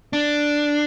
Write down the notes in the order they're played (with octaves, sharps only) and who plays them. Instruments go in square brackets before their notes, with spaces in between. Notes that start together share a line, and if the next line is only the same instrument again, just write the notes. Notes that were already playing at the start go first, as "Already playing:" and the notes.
[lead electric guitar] D4